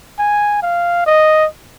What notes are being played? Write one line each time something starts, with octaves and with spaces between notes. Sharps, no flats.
G#5
F5
D#5